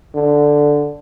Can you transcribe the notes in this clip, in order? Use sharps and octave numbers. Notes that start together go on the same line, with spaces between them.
D3